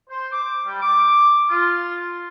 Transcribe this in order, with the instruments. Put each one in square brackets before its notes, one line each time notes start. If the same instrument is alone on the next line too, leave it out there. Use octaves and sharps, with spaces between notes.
[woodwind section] C5
D6
G3
D6
F4